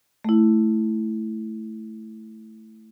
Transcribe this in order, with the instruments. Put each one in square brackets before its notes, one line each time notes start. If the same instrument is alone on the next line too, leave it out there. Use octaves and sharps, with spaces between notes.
[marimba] A3 E4